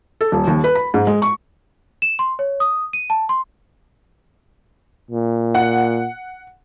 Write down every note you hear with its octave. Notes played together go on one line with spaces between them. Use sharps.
A4
D#1
D#2
B4
B5
G#2
G#3
C#6
E7
C6
C#5
D#6
D#7
A5
C6
A#2
F#5